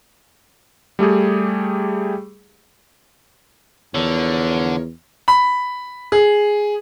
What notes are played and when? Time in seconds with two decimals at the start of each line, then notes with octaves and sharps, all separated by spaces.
0.99 G3 A3 G4 G#4
3.95 E2 D3 F3 A#4 C#5
5.28 B5
6.12 G#4